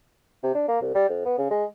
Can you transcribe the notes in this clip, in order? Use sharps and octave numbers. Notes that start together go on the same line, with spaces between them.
C3
D4
A#3
C2
G3
F2
B3
C#3
G#3